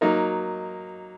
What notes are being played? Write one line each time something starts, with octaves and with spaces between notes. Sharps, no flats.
F#3 A#3 D#4 A#4